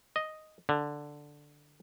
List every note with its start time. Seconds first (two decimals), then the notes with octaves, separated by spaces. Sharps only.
0.16 D#5
0.69 D3